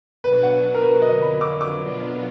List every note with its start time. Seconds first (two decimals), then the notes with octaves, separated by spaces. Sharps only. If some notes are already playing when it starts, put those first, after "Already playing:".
0.24 B2 F#3 D4 F#4 B4
0.43 F#5
0.74 A#4
0.82 B4
1.02 F2 D3 F#3 D#5
1.22 B5
1.41 D6
1.61 D6
1.80 B2 F#3 B3 D4 F4